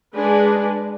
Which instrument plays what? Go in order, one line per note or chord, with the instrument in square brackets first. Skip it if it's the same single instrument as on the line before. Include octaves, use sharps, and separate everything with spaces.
[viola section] G#3 D4 G#4 B4